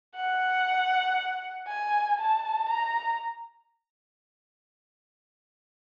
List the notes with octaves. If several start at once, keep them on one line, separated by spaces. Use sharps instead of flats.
F#5
G#5
A5
A#5